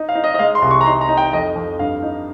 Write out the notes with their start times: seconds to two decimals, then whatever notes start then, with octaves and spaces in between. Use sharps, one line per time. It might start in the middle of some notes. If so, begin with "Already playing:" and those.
Already playing: D#4
0.09 F5
0.15 D#4
0.24 D#5
0.34 D#5
0.39 G#3 F5
0.55 C6
0.62 C2
0.71 C#6
0.81 A#5
0.86 D#4 C6
1.01 A#5
1.09 D#4
1.17 G5
1.33 F2 D#5
1.56 F2
1.79 G2 F5
2.03 D#4